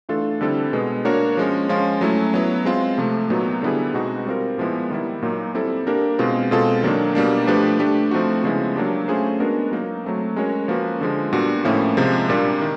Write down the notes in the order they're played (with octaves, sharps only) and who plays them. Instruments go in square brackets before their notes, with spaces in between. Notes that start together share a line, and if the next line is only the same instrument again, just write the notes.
[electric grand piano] E3 A3 D4 F4 A4
D3 G3 C4 E4 A4
B2 G#3 B3
A#3 D4 F#4 A#4 C#5
F3 G#3 C#4
F3 G#3 C#4 F4
F#3 A3 C#4 E4
F#3 B3 E4
G#3 C4 F4
C3 F3 A3
A#2 F#3 B3 D#4 F#4
D3 G3 B3 E4 G#4
B2 G#3 C4 D#4 F#4
G3 C4 F4 A#4
A#2 F3 G#3 B3 E4
D#3 G3 B3 E4
A#2 F#3 A#3 D#4
G3 C4 E4 A4
A#3 D4 G4 A#4
B2 G#3 C4 F4
B2 G#3 C4 F4 A4
D#3 F#3 A#3 D4
B2 G3 A#3 D4
F3 A3 D4 G4 B4
A3 D4 G4
F3 A3 C4 D#4 F#4
C#3 F3 G#3 B3 E4
F#3 A#3 D4 G4
A3 C#4 F4 G#4 C5
G#3 B3 D4 F#4 A#4
F#3 A#3 D#4
F#3 A3 C4
G#3 C#4 F#4 A#4 C#5
F3 A#3 C#4 F#4 B4
D3 F3 G#3
A#2 G3 B3 D4 F#4
A2 F3 A#3 C#4 E4
C3 F3 G#3
A#2 G3 A#3 D4
D#3